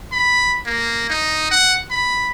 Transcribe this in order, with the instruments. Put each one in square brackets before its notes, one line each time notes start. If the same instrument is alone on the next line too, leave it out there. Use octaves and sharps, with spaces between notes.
[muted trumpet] B5
A#3
D#4
F#5
B5